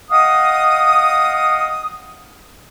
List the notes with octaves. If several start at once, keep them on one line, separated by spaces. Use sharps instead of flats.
D#5 F5 F#5 D#6